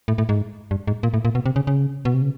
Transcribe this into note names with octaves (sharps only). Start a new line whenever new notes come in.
A2
A2
G#2
G2
G#2
A#2
A2
A#2
B2
C3
C#3
C#3
B2
C3
C#3